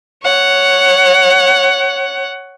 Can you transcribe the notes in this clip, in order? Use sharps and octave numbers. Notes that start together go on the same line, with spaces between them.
C#5 F#5